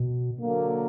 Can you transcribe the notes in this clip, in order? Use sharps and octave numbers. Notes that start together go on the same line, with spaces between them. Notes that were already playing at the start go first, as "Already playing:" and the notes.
Already playing: B2
D3 F#3 A#3